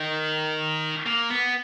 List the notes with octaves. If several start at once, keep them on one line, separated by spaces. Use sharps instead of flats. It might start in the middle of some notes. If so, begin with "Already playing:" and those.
Already playing: D#3
A#3
B3